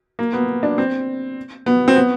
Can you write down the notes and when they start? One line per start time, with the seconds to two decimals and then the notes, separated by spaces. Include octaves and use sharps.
0.19 A#3
0.33 B3
0.63 D4
0.78 C4
1.66 B3
1.88 C4
1.96 B3